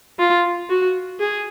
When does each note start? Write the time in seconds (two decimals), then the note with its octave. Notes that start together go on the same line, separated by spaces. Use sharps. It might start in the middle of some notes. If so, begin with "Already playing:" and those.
0.19 F4
0.70 F#4
1.20 G#4